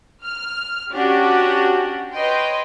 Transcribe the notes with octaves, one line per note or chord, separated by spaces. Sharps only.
F6
C#4 D4 F#4 G4 F#5
B4 C#5 D#5 G5 C6